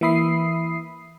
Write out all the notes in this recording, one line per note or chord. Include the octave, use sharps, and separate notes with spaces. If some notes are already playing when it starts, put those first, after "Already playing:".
E3 A#3 E5 B5 D#6 C7